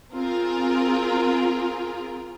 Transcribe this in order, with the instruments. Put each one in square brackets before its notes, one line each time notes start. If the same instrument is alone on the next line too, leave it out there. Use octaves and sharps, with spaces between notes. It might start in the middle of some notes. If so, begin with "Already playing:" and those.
[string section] C4 F4 G#4 A#4